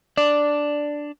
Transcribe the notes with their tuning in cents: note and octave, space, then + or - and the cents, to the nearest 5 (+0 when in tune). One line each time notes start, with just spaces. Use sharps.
D4 +0 D5 +0